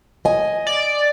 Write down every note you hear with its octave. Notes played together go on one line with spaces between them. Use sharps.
D#5 G#5
D5